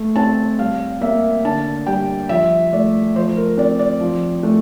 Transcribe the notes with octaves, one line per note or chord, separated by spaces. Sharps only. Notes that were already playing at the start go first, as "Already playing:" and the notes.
Already playing: A3
C4 A5
G3 F5
A#3 E5
D3 A5
G3 G5
F3 E5
A3 D5
F3 C5
A#4
C4 D5
D5
F3
A3